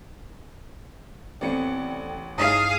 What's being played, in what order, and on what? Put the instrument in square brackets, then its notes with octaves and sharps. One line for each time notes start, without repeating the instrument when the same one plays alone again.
[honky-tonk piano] A1 B3 C#7 [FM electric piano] C4 A4 D5 [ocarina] G5
[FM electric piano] G2 E4 [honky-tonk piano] D#4 C#5 A5 [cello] G#4 F5 [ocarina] D#6